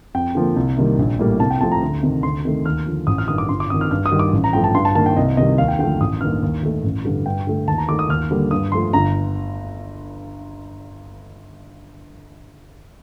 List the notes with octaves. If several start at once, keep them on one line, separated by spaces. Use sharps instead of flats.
F2 G5
D3 F3 A#3
C2
C3 D#3 G3 A#3
A#1
A2 G3 A#3
C2 A5
G5
C3 F3 A3 A5
A#5
D2
C3 D#3
D2 C6
C3 D#3 A3
D#2 F6
D3 F3
A1 D#6
F6
G2 D#3 D#6
D6
G1 C6
D6
F2 D#3 D#6
F6
G2 F6
D#6
D#3 G3
D6
A1
A#5
G2 F3 A3 G5
A5
G2 C6
A5
D#3 A#3 A5
G5
C2 D#5
C3 D#3 G3 D#5
D#2 F5
G5
D3 F3 A3 G5
A1 D#6
G2 D#3 A#3 F6
D#2
D#3 A3
A1
G2 D3 G3
G2 G5
D3 A3
D#2 A5
A#5
D#3 A3 D6
D#6
D#2 F6
D3 G3 A#3
G2 D#6
F3 A3 C6
G1 A#5